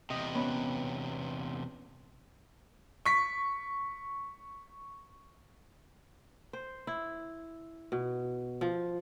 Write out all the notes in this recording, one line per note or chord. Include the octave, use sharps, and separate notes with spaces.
E2 C3 D#5
B3 C#4
C#6 B6
C5
E4
B2
F3